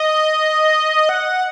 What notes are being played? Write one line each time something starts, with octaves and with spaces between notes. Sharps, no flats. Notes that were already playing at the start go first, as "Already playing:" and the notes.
Already playing: D#5
F#5